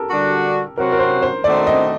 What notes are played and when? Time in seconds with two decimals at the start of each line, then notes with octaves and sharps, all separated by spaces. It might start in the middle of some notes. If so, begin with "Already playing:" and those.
Already playing: G4 A4 A#4
0.09 D3 G3 D4 F#4
0.77 C3 F#3 C4 F#4 A#4
0.92 A#4
0.99 C5
1.23 C5
1.44 D#3 A3 C4 D#4 F#4 D5
1.67 D#5